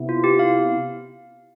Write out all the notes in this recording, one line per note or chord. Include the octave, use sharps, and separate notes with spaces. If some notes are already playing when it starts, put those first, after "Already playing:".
Already playing: C3 B3 E4
F4
G4
F5